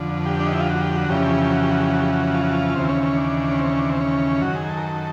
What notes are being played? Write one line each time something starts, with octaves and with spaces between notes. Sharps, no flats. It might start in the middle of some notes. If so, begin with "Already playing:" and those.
Already playing: F2 D3
G4
D4
D#4
E4
F4
F#4
G4
F#4
F2 C#3 E3 G4
F#4
G4
F#4
G4
F#4
G4
F#4
F4
F#4
F4
D#2 C#3 E3 C4
C#4
C#4
D4
C#4
C4
C#4
D4
C4
C#4
F#2 D#3 F#4
G#4
A4
A#4
A4